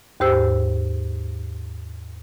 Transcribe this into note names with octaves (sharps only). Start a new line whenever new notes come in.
D#2 G#2 G4 C5 E6